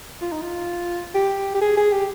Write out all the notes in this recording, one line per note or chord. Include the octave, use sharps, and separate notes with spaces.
F4
D#4
F4
G4
G4
G#4
G#4
G4